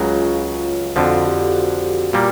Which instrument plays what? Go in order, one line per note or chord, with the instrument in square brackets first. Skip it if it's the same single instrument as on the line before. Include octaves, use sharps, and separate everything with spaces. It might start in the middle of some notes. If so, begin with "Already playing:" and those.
Already playing: [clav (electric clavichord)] C#2 C#3 F#3 [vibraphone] F4
[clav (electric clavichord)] F2 D3 F3 [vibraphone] F#4
[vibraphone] G4
F#4
[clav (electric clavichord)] A#2 G3 A#3